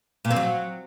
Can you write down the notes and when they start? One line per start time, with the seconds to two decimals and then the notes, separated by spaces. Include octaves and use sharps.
0.25 A#2
0.30 C4
0.36 F#3